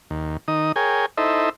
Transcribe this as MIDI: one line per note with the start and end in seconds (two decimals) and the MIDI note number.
0.10 0.37 39
0.48 0.72 51
0.48 0.72 63
0.48 0.72 87
0.76 1.06 68
0.76 1.06 70
0.76 1.06 73
0.76 1.06 79
0.76 1.06 80
1.17 1.49 63
1.17 1.49 64
1.17 1.49 69
1.17 1.49 72
1.17 1.49 75
1.17 1.49 76